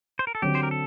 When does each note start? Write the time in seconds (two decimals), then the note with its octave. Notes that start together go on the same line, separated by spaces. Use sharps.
0.19 C5
0.27 A#4
0.35 A4
0.42 D3 F#3 C4 G4
0.55 C5
0.63 A#4
0.71 A4